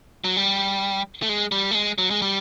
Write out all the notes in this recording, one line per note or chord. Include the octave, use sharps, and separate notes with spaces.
F#3
G3
A3
G#3
G3
A3
G#3
F#3
G#3
G3